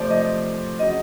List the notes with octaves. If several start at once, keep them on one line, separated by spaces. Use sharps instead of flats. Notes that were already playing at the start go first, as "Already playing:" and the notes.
Already playing: C3 F3 A3 C5 D5
D#5
C#3 F#3 D#5